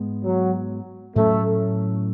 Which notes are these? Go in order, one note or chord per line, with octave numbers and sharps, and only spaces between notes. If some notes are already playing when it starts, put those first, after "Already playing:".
Already playing: G#2 G#3 B3
F#3
A2 F#3 A3 C#4